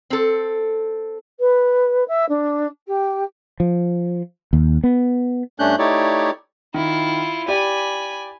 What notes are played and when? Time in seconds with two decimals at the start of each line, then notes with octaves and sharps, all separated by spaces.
0.10 C4 A4
1.40 B4
2.08 E5
2.29 D4
2.87 G4
3.60 F3
4.53 D#2
4.84 B3
5.59 G2 A3 C#4 D4 F#6 G6
5.79 A3 D#4 E4 G4 C#5 D5
6.74 D#3 E4 F4
7.48 G4 D5 G#5 B5